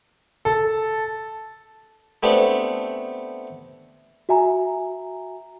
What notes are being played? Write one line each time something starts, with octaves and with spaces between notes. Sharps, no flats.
A4
A3 B3 C4 D4 G4
F#4 E5 G#5 A#5